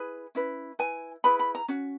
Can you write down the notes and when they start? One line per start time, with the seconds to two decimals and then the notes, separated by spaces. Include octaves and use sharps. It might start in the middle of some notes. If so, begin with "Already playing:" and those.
Already playing: E4 G#4 B4
0.35 C#4 E4 B4
0.79 E4 B4 G#5
1.24 E4 G#4 B4 B5
1.39 B5
1.55 A#5
1.68 C#4 F#4